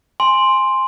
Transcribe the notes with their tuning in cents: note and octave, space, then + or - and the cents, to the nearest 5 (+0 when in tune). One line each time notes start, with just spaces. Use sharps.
G#5 +0 C6 +0